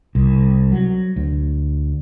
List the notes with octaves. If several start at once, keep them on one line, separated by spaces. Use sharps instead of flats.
C2
F#3
D2